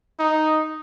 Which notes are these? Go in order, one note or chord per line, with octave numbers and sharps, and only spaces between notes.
D#4